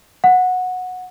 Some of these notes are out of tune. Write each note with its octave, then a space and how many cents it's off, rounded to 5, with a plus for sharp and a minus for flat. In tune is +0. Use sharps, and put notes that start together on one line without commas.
F#5 -15